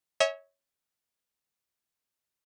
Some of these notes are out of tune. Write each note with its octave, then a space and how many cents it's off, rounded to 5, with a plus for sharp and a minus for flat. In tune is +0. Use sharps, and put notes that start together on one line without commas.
C#5 +0 E5 -35 G#5 +0